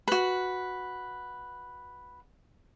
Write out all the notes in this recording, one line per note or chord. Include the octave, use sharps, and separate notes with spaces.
F#4 B4